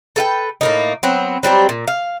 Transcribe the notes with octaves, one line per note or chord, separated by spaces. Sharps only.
A4 B4 F5 G5
A2 A#3 D#4
F#3 B3 C4
F#3 G3 C4 G4
A#2
F5